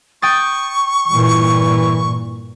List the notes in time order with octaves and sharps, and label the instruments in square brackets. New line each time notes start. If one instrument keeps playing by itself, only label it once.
[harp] G5 D#6 A6 [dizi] C#6
[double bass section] G2 A#2 [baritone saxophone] E3